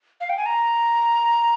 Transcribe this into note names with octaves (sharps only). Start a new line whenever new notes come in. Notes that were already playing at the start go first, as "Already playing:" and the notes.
F5
G5
G#5
A#5